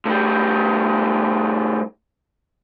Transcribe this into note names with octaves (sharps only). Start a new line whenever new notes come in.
A2 G3